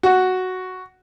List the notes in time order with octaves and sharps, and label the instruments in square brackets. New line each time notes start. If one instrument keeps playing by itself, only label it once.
[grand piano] F#4